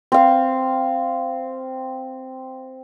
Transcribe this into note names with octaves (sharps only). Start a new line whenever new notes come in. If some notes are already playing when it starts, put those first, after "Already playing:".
C4 F5